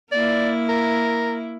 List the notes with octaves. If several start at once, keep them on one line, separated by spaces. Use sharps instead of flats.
A#3 E4 D5
A#4